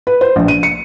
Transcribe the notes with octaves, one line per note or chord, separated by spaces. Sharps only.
B4
C5
A#1
D#7
C#7